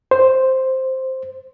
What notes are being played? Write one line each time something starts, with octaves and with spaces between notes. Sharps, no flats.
C5